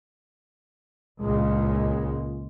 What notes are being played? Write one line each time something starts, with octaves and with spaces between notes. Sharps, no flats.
C#2 A#2 G#3